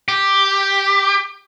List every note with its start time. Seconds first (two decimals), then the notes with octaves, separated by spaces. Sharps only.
0.08 G4